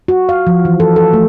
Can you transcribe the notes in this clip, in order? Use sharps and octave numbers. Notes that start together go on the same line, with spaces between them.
F#4
F5
F3
E3
A4
A4
A3